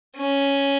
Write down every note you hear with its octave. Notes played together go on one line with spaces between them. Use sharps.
C#4